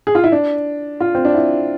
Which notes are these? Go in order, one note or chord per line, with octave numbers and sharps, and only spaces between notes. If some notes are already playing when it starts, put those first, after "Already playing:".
G#4
F4
E4
D4
F4
C4
D4
E4